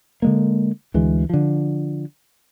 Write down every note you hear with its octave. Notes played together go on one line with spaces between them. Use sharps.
D3 G#3 A#3
D2 E3 G#3
D3 F3